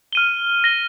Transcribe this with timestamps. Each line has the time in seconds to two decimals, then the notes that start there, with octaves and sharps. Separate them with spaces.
0.13 F6 D#7 G7
0.64 A#6 G7